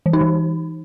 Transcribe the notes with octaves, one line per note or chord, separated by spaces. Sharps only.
E3
D#4
E3